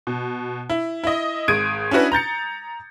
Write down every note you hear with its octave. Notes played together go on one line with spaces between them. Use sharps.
B2
E4
E4 D#5
G#1 G#3 D#6 G#6 D7 D#7
C#4 D4 E4 F#4 B4
A#5 G6 A6 C#7